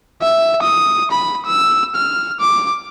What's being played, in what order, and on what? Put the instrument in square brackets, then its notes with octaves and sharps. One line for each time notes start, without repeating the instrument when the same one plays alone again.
[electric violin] E5
D#6
B5
E6
F6
D6